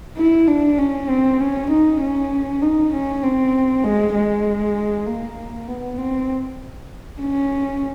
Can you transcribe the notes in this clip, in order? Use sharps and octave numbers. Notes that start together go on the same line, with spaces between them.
E4
D4
C#4
C4
C#4
D#4
C#4
D#4
C#4
C4
G#3
G#3
A#3
B3
C4
C#4